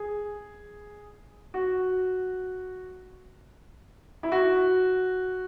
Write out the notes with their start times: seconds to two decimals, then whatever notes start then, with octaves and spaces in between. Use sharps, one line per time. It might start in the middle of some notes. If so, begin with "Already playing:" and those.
Already playing: G#4
1.54 F#4
4.23 E4
4.32 F#4